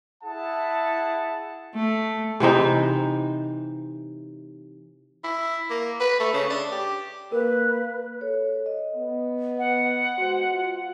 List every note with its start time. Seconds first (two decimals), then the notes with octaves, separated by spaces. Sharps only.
0.24 E4 G#4 F#5 A5
1.75 A3
2.40 C3 E3 C4 D#4
5.24 E4
5.70 A#3
6.00 B4
6.20 A3
6.33 C#3
6.50 D4
6.72 G4
7.32 A#3 A#4 B4
8.21 A4 C#5
8.66 D#5
8.95 B3
9.59 F#5
10.18 G#3 F#4 C5
10.52 F4